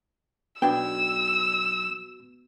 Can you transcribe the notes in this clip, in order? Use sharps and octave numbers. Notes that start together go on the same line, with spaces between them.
B1 B3 D4 F#4 G5 E6 G#6